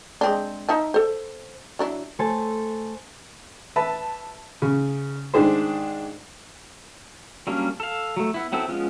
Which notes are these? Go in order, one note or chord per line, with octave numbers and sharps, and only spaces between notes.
G#3 C4 D4
D#4 E5 A5
A4 C5
F#3 D4 E4
A3 A4 C5 G#5 A5
B4 E5 A5
C#3
G#2 D#3 D4 G4 G#4 C5
F#3 G3 A#3 C#4 D4
A4 F5
F#3 A3
B3 E4
F#3 B3 C4 E4 A4
F3 G#3 B3 C#4 F4